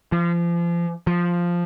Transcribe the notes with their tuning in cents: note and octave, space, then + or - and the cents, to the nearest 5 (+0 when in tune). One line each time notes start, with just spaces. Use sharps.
F3 -30
F3 +0